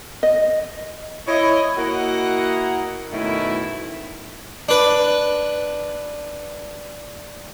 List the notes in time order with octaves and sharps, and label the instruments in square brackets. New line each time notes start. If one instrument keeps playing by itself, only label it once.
[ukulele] D#5
[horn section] E4 C#5 D#5
A#3 E4 F#4 A#4 D#5 F#5
F#2 B2 D#3 A3 E4
[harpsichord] D4 B4